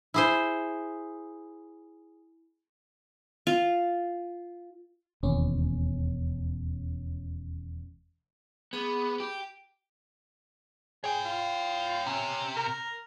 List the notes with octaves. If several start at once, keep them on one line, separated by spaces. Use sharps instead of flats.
E4 G#4 C5
F4
E1 D#2 C#4
B3 G#4 B5 D6
G4
G#4 C#5 G5
F4
C3 C#4
A#4